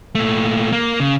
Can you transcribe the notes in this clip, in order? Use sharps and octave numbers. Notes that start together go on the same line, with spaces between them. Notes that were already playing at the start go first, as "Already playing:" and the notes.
A#2 A3
A#3
C#3